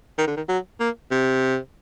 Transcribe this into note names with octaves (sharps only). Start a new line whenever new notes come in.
D#3
D3
D#3
F#3
A#3
C3